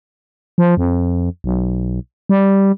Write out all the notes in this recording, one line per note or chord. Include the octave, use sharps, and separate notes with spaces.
F3
F2
B1
G3